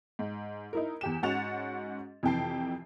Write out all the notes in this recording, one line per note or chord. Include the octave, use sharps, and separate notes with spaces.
G#2
D#4 E4 A#4
E2 G4 E7
G#2 C#4 F#4 F#5 A6 F7
F2 C3 E3 G5 A5 C7